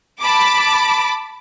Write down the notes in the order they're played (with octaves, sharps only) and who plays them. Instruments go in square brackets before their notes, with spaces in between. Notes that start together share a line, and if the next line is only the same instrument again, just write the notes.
[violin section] A5 B5 D6